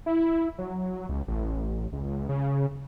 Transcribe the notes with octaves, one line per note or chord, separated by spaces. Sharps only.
E4
F#3
C#2
A1
C#2
C#3